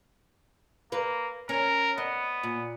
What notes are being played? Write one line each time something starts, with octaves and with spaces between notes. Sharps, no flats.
A#3 B4
C#4 A#4
B3 D#5
A#2